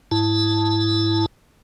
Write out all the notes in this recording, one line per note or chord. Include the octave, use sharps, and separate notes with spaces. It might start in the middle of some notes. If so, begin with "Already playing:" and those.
G#2 E4 A5